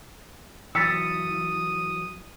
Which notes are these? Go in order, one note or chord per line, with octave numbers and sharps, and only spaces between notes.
E3 F#3 D#6 E6 A6 B6 C#7